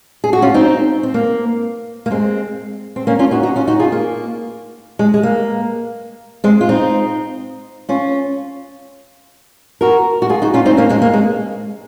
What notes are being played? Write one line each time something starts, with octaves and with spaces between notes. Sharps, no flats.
G#4
F#4
C#4 F4
C4 D#4
C4
A#3
A#3
G#3 C4
C4
A#3 C#4
C#4 F4
D#4 F#4
D#4 F#4
C#4 F4
D#4 F#4
F4 G#4
A#3
G#3
G#3
A#3
G#3 C4
F4
C4 D#4
C#4 F4
F#4 A#4
F#4
F4 G#4
D#4 F#4
C#4 F4
C4 D#4
A#3 C#4
G#3 C4
A#3
G#3